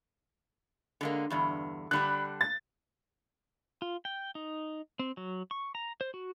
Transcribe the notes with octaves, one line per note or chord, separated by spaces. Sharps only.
D3 G#3 A#3
E2 G2 D3
D3 G3 D4 B5 F#6
A6
F4
G5
D#4
C4
F#3
C#6
A#5
C5
F#4